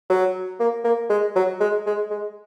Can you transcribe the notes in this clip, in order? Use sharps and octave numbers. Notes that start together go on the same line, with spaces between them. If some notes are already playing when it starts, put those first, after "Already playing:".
F#3
A#3
A#3
G#3
F#3
G#3
G#3
G#3